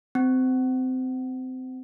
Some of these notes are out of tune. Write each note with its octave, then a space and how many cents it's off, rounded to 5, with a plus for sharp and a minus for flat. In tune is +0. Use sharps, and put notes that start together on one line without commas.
C4 -25